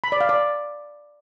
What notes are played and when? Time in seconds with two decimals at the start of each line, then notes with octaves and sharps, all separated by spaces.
0.04 B5
0.12 D5
0.21 F5
0.29 D5